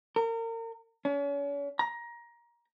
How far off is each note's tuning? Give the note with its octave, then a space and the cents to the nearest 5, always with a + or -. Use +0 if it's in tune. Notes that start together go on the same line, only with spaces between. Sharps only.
A#4 -35
C#4 +40
A#5 +20